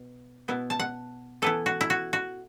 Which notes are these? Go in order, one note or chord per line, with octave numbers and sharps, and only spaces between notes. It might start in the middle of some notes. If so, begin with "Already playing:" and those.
Already playing: B2 B3
B2 B3 E4
A5
F#5
E3 B3 E4 A4
F#4
E4
F#4
F#4